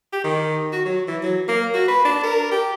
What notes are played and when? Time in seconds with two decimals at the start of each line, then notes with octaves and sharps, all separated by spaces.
0.13 G4
0.24 D#3
0.73 F#4
0.86 F#3
1.08 E3
1.23 F#3
1.48 A#3
1.74 F#4
1.88 B4
2.05 D4
2.23 A#4
2.52 G4